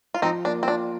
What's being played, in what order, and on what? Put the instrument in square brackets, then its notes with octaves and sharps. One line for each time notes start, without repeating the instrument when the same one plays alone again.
[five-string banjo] F4
[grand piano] F3 [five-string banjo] C4 D#4
[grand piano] A#3 [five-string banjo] D4
[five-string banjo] C4
[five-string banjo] D4 [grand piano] F4